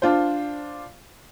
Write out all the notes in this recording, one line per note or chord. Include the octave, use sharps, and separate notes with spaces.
D4 F4 C5